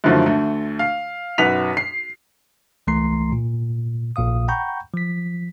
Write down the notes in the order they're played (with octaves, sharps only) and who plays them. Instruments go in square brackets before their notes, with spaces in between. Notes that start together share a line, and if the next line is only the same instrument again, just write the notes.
[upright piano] F#2 D3 D#3 F3 A3
D2 A3
F5
B1 F#2 B4 F#5 B6 F7
C7
[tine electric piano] C2 E3 A3 A#5 C6 C7
A#2
A#1 A#2 F5 D#6
F#5 G5 A#5 B5 C#6 G6
F3 B6